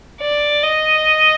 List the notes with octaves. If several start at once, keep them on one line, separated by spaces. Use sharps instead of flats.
D5
D#5